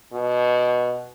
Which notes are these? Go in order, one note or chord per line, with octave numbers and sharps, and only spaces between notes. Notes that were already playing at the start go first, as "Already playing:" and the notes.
B2